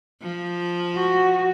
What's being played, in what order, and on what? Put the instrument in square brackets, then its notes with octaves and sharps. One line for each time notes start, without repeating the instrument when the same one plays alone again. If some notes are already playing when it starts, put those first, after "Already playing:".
[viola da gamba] F3
[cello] F#4